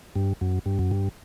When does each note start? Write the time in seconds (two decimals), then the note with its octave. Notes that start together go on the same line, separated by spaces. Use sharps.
0.16 G2
0.41 F#2
0.66 G2
0.79 F#2
0.91 G2